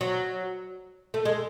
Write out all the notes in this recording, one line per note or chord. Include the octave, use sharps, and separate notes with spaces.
F#3
A3
G#3